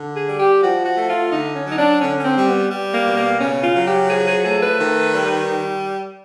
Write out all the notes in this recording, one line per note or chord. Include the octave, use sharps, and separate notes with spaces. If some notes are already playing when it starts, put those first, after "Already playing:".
Already playing: D3
G#4
G3
G4
F3 F#4
F#4
A3
F4
D3 D#4
C#4
F#3
D#4
D4
D3 C#4
C#4
C4
G3
B3
G3
A#3
B2
A#3
C#3 C#4
F4
F#3
G4
F3 G#4
G#4
A3 G#4
B4
D#3
G3